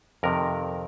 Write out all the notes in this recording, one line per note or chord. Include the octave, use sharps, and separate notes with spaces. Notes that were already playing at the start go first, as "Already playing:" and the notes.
F2 C3 D#3 A#4